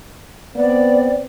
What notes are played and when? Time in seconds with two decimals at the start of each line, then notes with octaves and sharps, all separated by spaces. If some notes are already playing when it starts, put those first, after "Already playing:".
0.55 B3 C4 D5